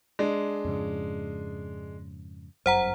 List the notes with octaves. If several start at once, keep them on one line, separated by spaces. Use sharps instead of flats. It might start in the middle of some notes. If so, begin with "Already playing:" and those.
G#3 D4
F2 G#2 C#3
G1 F#2 C5 F#5 A#5